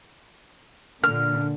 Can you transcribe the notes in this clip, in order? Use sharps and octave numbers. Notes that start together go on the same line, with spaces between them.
A#2 D3 F6